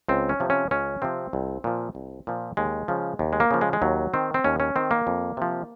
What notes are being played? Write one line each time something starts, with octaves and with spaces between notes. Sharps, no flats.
C#2 C4
C#4
C3 F3
C#4
C#2 C#4
C3 F3 C4
C2
A#2 F3
C2
A#2 F3
D#2 G#3
C#3 F3
D#2
G#3
A#3
C#3 F3
G#3
G#3
D#2 F#3
D#3 C4
C4
D#2 C#4
C#4
D#3 C4
A#3
F2
C3 F3